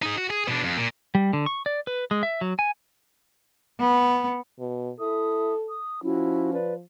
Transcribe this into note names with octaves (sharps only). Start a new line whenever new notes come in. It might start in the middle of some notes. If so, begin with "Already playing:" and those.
D#4 G#4
F#4
G#4
B2 D4
F2
A#2
G3
D3
C#6
D5
B4
G#3
E5
F#3
G#5
B3
B2
E4 A4 E5 D#6
D#6
F3 C#4 E4 F#4
B4 D5